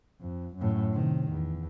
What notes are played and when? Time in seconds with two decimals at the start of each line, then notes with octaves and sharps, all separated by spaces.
0.21 F2
0.57 F#2 A2
0.93 C3 D#3
1.31 E2